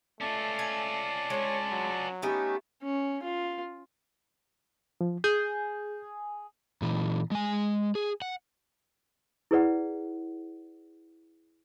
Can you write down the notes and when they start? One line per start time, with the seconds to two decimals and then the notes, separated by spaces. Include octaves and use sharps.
0.21 A3 C#4 F4 D5 A5
0.59 G#5
1.30 G#3 D4 C#5
1.71 F#3
2.22 A3 B3 C#4 D#4 G4
2.83 C#4
3.23 F4
5.01 F3
5.24 G#4 G6
6.82 A#2 E3
7.31 G#3 G#5
7.95 G#4
8.22 F#5
9.51 E4 G#4 B4 D5 F#5